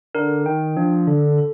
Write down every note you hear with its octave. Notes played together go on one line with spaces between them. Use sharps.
D3 A#4
D#3 G5
F3 D4
D3 A4
A4